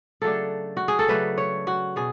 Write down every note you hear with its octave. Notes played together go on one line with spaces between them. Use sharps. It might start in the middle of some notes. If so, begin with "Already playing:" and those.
C#3 F#3 A3 D4 A4
F#4
G#4
A4
C#3 F#3 A3 D4 B4
C#5
F#4
B2 G#4